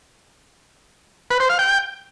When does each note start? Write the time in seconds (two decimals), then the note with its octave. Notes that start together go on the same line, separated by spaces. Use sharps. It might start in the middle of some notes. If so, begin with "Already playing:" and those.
1.31 B4
1.40 C5
1.49 F5
1.59 G5